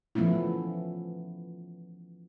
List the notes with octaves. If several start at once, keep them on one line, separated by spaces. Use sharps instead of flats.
E3 F3 A3 B3 C#4 E4